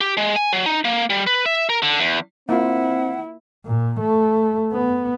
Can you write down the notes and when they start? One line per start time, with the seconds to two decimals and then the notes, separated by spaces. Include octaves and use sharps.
0.01 G4
0.17 G#3
0.36 G#5
0.53 F#3
0.66 D#4
0.85 A#3
1.10 G3
1.27 B4
1.46 E5
1.69 A#4
1.82 D3
1.99 E2
2.49 A#3 C4 E4 F4 F#5
3.66 A#2
4.00 A3
4.72 B3